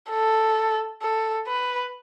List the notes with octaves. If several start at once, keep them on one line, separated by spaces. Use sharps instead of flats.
A4
A4
B4